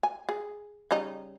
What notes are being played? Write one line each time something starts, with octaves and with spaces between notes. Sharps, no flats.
G#5
G#4
C#3 G3 D#4